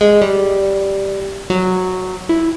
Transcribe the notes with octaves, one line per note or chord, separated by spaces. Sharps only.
G#3
G3
F#3
E4